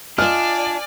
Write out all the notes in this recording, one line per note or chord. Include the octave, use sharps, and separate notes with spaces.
D4 F4 D5 D#5 G#5 F6